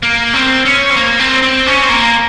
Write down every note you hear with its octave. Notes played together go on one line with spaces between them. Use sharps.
A#3
C4
C#4
C4
A#3
C4
C4
C#4
C4
A#3